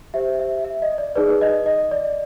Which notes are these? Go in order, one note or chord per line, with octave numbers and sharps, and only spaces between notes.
G4 C5 E5
E5
E5
D#5
D5
D#4 G#4 B4 D5
D#5
D#5
D5